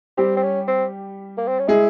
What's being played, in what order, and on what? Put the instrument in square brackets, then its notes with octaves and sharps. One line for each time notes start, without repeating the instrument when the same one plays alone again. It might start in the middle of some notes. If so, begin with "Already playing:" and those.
[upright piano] G3 G4 [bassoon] C4
[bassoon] C4
C#4
C4
A#3
C4
C#4
[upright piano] G#3 G#4 [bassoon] E4